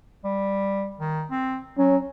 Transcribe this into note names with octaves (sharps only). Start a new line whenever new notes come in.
G3
D#3
C4
F#3 C#4